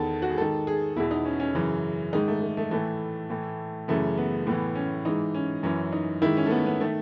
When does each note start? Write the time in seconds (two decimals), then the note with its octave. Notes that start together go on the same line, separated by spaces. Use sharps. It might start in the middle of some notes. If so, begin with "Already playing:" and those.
Already playing: E2 D#3 A4
0.22 F#4
0.30 G#4
0.37 G#2 D#3 A4
0.67 G#4
0.96 E2 B2 E4
1.11 D#4
1.25 C#4
1.40 C#4
1.55 F#2 C#3 E3
2.13 G#2 D#3 D#4
2.28 A3
2.42 A3
2.57 A3
2.71 A2 E3 A3
3.30 A2 E3
3.88 F#2 C#3 E3 A3
4.17 B3
4.47 A2 E3 B3
4.75 C#4
5.05 G#2 E3 D#4
5.34 C#4
5.63 F#2 E3 C#4
5.92 D#4
6.22 G#2 D#3 E4
6.37 C#4
6.46 A3
6.51 B3
6.66 B3
6.81 D#3 A3